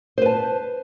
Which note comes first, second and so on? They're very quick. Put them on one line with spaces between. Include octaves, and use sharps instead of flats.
C5 B4 A5